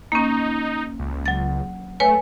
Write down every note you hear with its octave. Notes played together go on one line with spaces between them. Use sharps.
A#3 C#4 D#4
C#2
F#3 A6
A3 B4 C#5 G#5